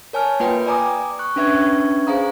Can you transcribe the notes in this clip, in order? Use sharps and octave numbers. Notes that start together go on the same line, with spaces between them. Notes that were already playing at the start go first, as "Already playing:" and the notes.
A#4 C#5 G#5 A5 F6
A#3 F4 B4 G5
D5 G#5 A#5 D6 D#6
C#6 F#6
C#4 D4 B4 E5 C#6 G#6
G#4 C5 F5 A#5 D#6